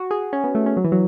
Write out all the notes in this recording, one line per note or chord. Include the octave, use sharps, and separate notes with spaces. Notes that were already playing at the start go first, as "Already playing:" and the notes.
Already playing: F#4
G#4
C#4
B3
A3
C#4
F#3
E3
F#3